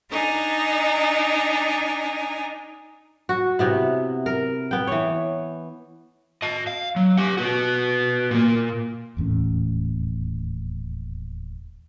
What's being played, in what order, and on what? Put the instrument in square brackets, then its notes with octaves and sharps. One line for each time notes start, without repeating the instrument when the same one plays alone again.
[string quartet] D4 D#4 G#5 A#5
[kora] F#4
C3 B3 E4
A#4
B3 G5
E3 C#5
[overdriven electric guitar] D#5 A5
F5
F#3
G4 F#5
B3 F#4
A#2 A#3
[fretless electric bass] D#1 E2 A2 C#4